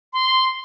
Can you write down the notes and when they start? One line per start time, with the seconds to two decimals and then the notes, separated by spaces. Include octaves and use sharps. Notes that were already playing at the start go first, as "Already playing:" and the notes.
0.13 C6